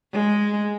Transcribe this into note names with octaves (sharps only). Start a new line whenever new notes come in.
G#3